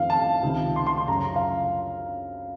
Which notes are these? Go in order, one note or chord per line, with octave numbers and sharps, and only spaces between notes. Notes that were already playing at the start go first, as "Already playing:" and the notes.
Already playing: F2 D#3 F5
A5
C#2 C3 D#3
C6
C6
C6
F#2 C#3 A#5
F5